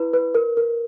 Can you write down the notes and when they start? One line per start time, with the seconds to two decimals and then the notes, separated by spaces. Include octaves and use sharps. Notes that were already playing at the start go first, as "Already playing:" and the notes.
Already playing: E4 B4
0.13 B4
0.35 A#4
0.57 A#4